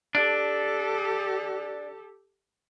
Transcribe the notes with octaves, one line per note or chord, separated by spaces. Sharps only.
D4 G4 A4